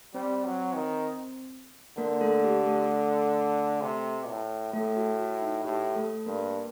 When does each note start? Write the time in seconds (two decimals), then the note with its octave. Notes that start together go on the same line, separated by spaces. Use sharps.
0.14 G3 C4 C5
0.45 F#3
0.75 D#3
1.97 D3 A#3 A#4
2.21 A3 A4
2.44 G4
2.67 A3 A4
3.81 C3
4.28 A2
4.73 A2 A3 A4
4.96 F#4
5.20 F#4
5.42 D#4
5.65 A2 G4
5.96 A3 A4
6.26 G2 A#3 A#4